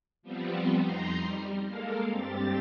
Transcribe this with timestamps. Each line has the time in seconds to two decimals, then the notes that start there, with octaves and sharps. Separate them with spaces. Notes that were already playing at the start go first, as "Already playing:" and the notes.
0.23 F3 G3 B3 C4
0.83 F2 D#4 A#5 C6 C7
1.20 G3
1.67 G#3 A#3 A4 A#4 F5
2.10 G2 C4 G4 A6